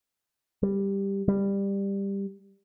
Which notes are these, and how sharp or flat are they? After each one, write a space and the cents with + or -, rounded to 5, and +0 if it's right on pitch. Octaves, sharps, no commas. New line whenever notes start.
G3 +10
G3 +15